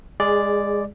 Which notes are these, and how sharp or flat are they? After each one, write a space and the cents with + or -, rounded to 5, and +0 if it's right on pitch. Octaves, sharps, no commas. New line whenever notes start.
G#3 -20 G#4 +0 D5 +0